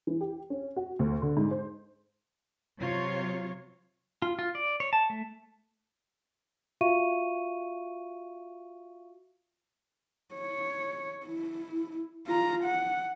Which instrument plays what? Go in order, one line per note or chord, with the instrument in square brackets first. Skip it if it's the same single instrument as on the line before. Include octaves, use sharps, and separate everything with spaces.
[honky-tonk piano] E3
G4
C#4
F#4
D2
D3
G#2
C5
[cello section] C3 F#3 F4 C#5
[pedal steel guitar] F4
F4
D5
C#5
A5
A3
[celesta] F4 F#4 E5 F5 C#6 D#7
[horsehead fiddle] C#5
E4
F4 A#5
F#5